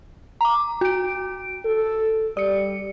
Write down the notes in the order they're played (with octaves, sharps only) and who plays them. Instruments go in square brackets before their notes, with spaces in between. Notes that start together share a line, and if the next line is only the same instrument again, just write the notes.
[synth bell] A#5 D6
F#4 D7
[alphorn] A4
[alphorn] G3 [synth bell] D5 C#7